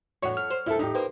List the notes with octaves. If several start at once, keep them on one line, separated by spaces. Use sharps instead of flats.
E2 A2 F#4 C#5 F#5
F2 F6
C5
A#2 A3 E4 A4
E2 A2 D#4 G4
A#3 F4 B4 C5 G5